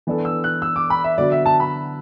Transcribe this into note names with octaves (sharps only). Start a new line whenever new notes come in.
E3 B3 D4 A4
E6
F#6
E6
D6
B5
E5
D3 F#3 B3 F#4 D5
E5
A5
B5